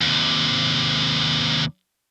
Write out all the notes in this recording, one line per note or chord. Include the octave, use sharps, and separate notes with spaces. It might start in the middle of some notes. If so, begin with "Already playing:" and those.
D#2 C3